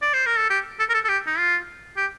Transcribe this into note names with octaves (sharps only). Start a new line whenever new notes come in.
D5
C5
A#4
A4
G4
A4
A#4
A4
A4
G4
D#4
F4
G4